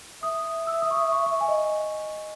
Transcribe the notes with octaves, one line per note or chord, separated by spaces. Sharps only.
E5 D#6
E6
D#6
C#6
D#6
C#6
C#6
G#5
D#5